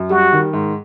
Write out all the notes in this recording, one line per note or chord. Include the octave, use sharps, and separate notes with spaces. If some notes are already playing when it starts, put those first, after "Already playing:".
Already playing: F#2
G3 F#4
D#3
G#2